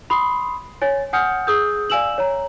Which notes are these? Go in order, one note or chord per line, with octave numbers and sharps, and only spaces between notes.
B5 C6 D#6 C7
C#5 G#5 A6
F#5 G#5 D#6 F6 G6 C#7
G#4 D#6 E6 G6
D5 F5 G#5 E6 E7 F#7
C#5 A#5